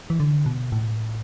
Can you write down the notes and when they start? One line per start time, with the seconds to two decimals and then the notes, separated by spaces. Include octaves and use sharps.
0.10 E3
0.20 D3
0.46 B2
0.72 A2